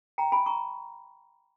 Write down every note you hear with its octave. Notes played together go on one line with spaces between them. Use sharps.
G5 A#5
G#5 B5
A#5 C#6